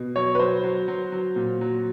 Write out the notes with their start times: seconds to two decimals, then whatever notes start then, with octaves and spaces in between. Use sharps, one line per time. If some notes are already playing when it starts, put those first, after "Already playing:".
Already playing: B2
0.16 F#3 C#5
0.35 B4
0.39 F#3 C5
0.64 F#3
0.88 F#3
1.12 F#3
1.36 A#2
1.61 F#3